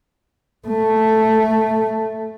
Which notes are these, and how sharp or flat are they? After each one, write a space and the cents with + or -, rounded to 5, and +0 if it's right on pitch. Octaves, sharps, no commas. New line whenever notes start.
A3 +0